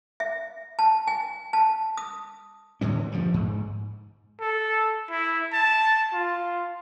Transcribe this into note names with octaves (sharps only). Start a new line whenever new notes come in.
E5
A5
G#5
A5
D#6
A2 D3 E3 C#4
G2 F3
G#2
A4
E4
A5
F4